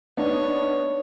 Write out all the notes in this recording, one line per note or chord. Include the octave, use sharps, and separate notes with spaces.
B3 D4 D#4 C#5